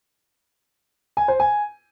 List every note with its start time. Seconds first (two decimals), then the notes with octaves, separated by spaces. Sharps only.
1.17 G#5
1.28 C5
1.40 G#5